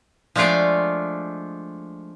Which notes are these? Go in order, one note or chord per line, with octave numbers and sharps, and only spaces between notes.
F3 G#3 A3 D4 F4 D5